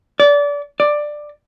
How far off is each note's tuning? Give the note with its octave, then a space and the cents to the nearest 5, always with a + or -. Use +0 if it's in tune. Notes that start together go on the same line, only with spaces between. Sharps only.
D5 -25
D5 +10